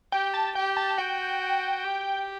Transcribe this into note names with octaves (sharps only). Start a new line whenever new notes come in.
G4 G5
A5
G4 G5
A5
F#4 G5
G4